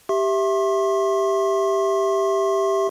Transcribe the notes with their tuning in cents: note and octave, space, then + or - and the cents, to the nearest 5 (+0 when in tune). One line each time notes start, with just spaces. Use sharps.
G4 +0 E5 +0 C6 +40